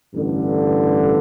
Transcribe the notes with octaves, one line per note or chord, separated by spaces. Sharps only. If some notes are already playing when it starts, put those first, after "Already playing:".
A1 G2 D3